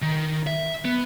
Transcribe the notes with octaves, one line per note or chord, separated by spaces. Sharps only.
D#3
E5
B3